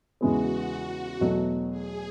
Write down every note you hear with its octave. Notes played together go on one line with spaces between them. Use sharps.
E2 C#3 E3 G#3 B3 F#4
E2 B2 F#3 A3
G#4